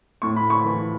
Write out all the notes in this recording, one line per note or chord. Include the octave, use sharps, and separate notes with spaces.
A2 C#6
B5
C#6
E3